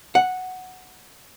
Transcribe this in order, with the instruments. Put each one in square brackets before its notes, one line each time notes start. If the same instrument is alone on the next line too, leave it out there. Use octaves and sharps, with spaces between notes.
[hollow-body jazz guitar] F#5